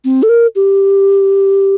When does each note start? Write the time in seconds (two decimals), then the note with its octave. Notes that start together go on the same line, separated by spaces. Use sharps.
0.05 C4
0.23 A4
0.29 A#4
0.55 G4